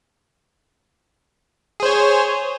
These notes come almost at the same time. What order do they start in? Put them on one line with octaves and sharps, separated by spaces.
G#4 C5 C#5